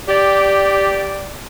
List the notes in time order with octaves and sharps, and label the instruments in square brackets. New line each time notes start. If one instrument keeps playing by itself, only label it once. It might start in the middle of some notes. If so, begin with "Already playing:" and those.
[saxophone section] G4 D5